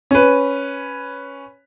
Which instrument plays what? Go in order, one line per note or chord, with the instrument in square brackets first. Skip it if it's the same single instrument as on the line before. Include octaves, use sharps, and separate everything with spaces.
[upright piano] C#4 B4